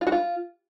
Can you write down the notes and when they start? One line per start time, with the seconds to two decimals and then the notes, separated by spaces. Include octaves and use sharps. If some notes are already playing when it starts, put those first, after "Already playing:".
0.01 F4
0.07 F#4
0.12 F4